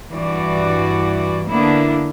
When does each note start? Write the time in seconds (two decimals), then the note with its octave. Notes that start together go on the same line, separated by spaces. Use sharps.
0.10 G2 E3 F#4 D5
1.49 D3 A#3 B3 D4 E4